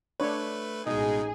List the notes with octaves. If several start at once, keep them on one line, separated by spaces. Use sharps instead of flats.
A3 D4 B4 C#5
A1 B2 G#3 D#4 G#4